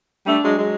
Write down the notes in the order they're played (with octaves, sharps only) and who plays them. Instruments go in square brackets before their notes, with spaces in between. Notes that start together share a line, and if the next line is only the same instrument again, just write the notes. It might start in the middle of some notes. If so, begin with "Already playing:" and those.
[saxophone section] G3 A3 [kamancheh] D4
[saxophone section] F#3 G#3
F#3 G#3